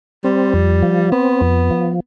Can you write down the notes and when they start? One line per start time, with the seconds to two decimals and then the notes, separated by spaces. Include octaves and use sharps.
0.24 G3 C4
0.54 F2
0.83 F3
1.12 B3 C4
1.41 F2
1.71 F3